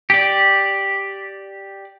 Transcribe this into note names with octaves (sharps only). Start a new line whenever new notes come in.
G4 D5